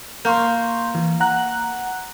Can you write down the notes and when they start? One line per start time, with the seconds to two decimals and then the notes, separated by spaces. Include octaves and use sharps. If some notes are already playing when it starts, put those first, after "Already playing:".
0.25 A#3 C6 C#6 G6
0.95 E3
1.20 F#5 A#5 F#6